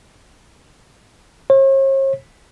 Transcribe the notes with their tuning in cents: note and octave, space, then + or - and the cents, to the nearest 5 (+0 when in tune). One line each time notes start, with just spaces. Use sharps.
C#5 -45